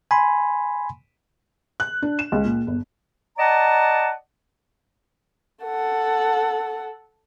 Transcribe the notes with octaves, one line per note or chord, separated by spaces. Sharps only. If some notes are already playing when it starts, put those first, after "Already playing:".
G#5 B5 C6
F#6
D4
E7
C#2
A#2
G1
D5 D#5 F#5 A5 A#5
A4 F#5